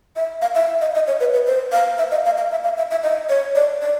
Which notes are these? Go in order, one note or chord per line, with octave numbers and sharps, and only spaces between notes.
E5
F5
E5
D#5
D#5
C#5
B4
B4
C5
F5
E5
D#5
F5
F5
E5
F5
E5
E5
D#5
C#5
D5
D5